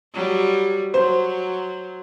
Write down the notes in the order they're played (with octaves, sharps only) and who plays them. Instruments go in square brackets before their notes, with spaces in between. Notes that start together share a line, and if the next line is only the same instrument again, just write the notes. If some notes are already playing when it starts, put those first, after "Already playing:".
[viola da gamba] F#3 G3
[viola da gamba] F#3 [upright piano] C5